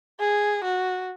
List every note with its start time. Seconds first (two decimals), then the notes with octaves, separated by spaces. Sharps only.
0.20 G#4
0.64 F#4